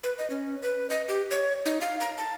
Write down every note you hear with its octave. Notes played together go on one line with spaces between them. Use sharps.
B4
D#5
C#4
B4
D#5
G4
C#5
D#4
F5
A#5
A5